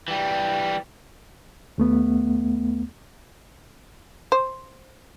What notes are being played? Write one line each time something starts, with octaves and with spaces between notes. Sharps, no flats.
E3 G3
D#2 A3 B3
C5